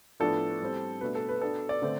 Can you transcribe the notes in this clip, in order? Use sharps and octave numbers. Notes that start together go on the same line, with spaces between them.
A2 F3 B3 D4 A4
A2 G3 C4
B2 A3 D4 B4
A4
B4
B2 B3 D4 A4
D5
D3 A3 C4